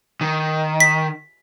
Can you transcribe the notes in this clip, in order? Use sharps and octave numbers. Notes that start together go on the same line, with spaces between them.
D#3
B6